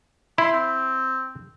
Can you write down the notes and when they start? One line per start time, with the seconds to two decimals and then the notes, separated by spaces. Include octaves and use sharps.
0.38 E4 C6
0.52 C4